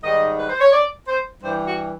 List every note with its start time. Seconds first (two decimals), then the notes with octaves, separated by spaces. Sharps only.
0.03 G#2 D#3 G3 D#5
0.38 B4
0.49 C5
0.61 C#5
0.73 D5
1.08 C5
1.42 G2 E3 G3 C5
1.65 F#4